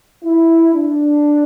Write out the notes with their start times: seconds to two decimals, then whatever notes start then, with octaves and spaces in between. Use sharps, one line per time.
0.24 E4
0.74 D4